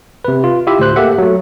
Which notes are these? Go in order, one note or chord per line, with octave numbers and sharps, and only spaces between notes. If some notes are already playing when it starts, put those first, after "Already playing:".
C3 B4
F4
E4 F4 G4 E5
D2 A2 C5 F#6
A#3 G4 A4 E5 F#5
F#3 A3